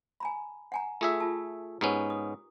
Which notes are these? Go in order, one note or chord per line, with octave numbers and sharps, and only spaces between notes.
G#5 A#5 B5
F#5 G#5 A#5
A3 F4 G#4 A4 E5
F4 A5
G#2 B3 C#4 G4 A#4 A#5
D#6